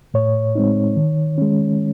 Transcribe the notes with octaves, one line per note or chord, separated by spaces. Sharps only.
A2 C#5
G#3 C4 D#4
D#3
G#3 C#4